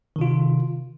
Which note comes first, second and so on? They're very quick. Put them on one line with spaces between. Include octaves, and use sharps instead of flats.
D#3 C3 F4